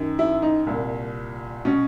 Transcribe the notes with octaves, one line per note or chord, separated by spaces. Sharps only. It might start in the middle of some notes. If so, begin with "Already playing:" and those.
Already playing: F#2 D#3
E4
D#4
C2 A#2
B2 C#4